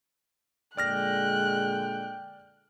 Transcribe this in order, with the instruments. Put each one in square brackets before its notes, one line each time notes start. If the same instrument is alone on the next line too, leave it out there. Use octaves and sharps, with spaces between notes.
[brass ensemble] A#2 D3 G#3 [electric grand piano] D5 F6 A#6 [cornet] G5 [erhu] F#6